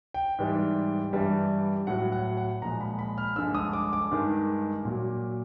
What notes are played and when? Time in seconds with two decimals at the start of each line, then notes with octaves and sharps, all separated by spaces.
0.14 G5
0.39 G#2 E3 G3
1.13 G2 E3 G3
1.87 A2 F#3 F#5
2.12 F#5
2.37 F#5
2.62 A#2 F3 G#3 A#5
2.81 B5
2.99 B5
3.18 F6
3.36 G2 D3 F3 G#3 E6
3.55 D#6
3.73 D6
3.93 D6
4.11 G2 D#3 G#3
4.85 A#2 F#3